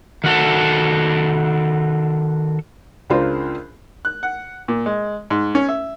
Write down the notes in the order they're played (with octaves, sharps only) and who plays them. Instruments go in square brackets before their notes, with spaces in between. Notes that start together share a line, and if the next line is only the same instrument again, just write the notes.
[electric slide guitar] D#3 F#4 A4
[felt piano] C#2 C#3 D4 F4 A#4 C5
[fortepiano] F#6
F#5
A#2
G#3
G#2
C#4
E5